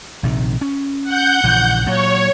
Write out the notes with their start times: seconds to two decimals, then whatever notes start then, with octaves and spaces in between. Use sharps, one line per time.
0.23 A#1 C3 D#3
0.61 C#4
1.03 F#5 G6
1.44 A#1 C#3 E3
1.86 A#2 F#3 C#5